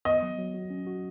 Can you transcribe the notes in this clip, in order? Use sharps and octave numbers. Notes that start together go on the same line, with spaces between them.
B3 D#5
F#3
F#3
F#4
C#4
F#4